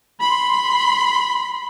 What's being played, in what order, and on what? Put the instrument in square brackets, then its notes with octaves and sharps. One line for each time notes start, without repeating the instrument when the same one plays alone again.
[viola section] B5 C6